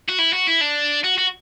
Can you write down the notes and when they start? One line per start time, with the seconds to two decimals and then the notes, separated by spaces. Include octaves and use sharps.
0.09 F#4
0.18 E4
0.33 F#4
0.47 E4
0.61 D4
1.04 F#4
1.18 F#4